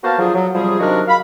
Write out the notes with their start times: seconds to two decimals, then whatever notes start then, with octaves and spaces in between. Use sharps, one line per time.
0.03 A#3 B3 F#4 C5 F5 A5
0.18 D3 F3 F#3 F4 G#4
0.34 F#3
0.55 C3 F3 G3 G#4
0.79 C3 D#3 F#3 D4 F#4 A#4
1.07 F5 B5